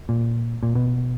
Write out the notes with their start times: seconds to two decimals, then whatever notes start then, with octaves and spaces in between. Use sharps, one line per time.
0.09 A#2
0.63 A#2
0.75 B2